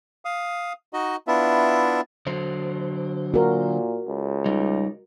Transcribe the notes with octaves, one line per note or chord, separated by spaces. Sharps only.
F5 D#6
D#4 F#4 D#5
B3 D4 E4 F4 E5
D3 F#3 C5
A#2 F#4 A#4
C#2
G3 D#4